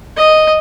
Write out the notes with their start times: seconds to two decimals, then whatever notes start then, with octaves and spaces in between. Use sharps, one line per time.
0.17 D#5